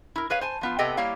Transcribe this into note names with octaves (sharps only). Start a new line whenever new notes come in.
E4 A#4
G#4 B4 C#5 F5
C5 G#5 A5
F3 B3 F4
C3 B3 G4 A4 D#5 G5
G3 A#3 E4 C#5 F5